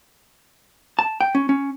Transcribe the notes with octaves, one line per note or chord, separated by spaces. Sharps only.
A5
G5
C#4
C#4